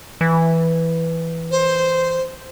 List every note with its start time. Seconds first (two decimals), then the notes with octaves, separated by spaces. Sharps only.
0.21 E3
1.51 C5